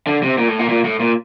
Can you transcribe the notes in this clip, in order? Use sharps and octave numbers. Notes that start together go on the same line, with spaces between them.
D3
C3
A#2
A2
A#2
A#2
A2
A#2